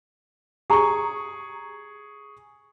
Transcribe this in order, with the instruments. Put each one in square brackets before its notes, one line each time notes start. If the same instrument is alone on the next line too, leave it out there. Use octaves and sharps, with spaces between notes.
[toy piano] G4 A#5 [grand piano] G#4 C#6